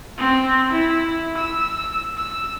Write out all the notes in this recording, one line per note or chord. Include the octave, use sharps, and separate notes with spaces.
C4
E4
E6
E6